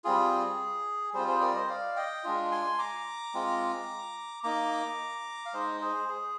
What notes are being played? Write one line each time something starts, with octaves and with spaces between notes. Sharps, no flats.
G3 C4 F4 G#4
G3 C4 F4 G#4 C5
G#4 C5
A#4 D5
C5 D#5
D5 F5
D#5 G5
G#3 D4 F4
G#5 C6
A#5 D6
G#3 C4 F4
A#3 D#4 A#5 D6
F5
G#3 D#4 C5 D#5
G#4 C5
G#4